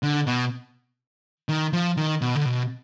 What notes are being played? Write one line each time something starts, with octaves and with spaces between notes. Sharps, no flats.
D3
B2
D#3
F3
D#3
B2
D3
B2